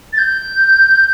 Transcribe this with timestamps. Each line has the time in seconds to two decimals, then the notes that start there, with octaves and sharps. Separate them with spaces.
0.13 A6
0.18 G6